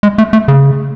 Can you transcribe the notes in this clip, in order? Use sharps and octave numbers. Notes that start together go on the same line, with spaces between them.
G#3
A3
A3
C#3